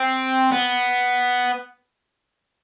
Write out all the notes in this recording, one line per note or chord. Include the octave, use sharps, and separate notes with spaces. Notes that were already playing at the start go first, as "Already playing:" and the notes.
Already playing: C4
B3